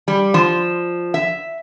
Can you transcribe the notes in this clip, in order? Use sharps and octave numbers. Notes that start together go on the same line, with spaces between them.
G3
F3
E5